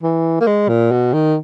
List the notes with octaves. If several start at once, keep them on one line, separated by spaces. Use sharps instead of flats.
E3
A#3
G#3
A#2
B2
D#3